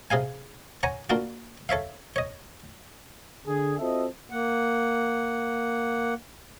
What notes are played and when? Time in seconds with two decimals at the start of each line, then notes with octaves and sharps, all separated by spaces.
0.11 C3 G#4 F5 G#5
0.83 C#5 F#5 G#5 A#5
1.10 A#3 D4 F4 F#4
1.69 A4 C#5 E5 F5
2.16 C#5 D#5
3.46 D3 G#4
3.79 C4 F4 F#4 A4 D#5 E5
4.30 A#3 F#5